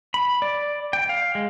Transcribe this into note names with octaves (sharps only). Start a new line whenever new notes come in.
B5
D5
G5
F5
G#3